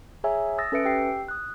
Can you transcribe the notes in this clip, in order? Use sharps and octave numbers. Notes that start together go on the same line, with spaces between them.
G#4 C#5 E5 G#5 A#5 E6
D#6 E6 A6 A#6
C#4 A4 B4 E5 C#7 D7
G4 G5 E6 C7
D#6 F#6